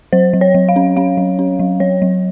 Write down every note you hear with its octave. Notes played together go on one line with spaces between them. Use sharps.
F#3 C5
F#3
C#5
F#3
F5
C#4
C#4 F5
F#3
C#4
F#3
F#3 C#5
F#3